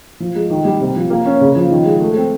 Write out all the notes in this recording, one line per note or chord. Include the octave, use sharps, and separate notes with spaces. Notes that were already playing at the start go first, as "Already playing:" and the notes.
F3
G#3
D#3
G3
C3
F3
A#3
C#4
C#3
F3
D#3
G#3
A3
C4